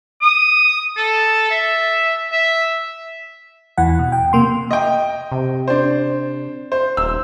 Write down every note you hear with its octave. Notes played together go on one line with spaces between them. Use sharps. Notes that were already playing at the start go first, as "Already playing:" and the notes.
D#6
A4
E5
E5
E2 E3 F#5
B2
G5
C3 A#3 C6
D#5 G5
C3
D4 C5
C5
D#1 E6